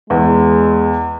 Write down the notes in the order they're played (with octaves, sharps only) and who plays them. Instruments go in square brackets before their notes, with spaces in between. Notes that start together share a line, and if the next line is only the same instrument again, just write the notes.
[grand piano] E2 [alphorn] G#3